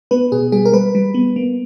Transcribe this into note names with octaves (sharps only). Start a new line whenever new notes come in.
B3 B4
B2 G#4
G3 G#4
A#4
G3 B4
G3
B3
A#3